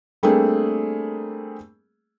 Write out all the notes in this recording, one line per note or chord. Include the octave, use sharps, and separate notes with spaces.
G3 A3 A#3 C4 D4 G#4